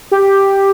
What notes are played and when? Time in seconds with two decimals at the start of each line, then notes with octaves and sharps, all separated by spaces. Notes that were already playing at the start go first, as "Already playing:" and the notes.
0.11 G4